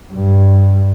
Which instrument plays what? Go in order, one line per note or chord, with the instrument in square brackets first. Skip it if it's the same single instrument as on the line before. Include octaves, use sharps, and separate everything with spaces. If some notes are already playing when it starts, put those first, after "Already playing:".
[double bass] G2